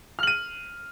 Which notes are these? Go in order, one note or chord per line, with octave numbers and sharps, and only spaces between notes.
F6 D#7 F#7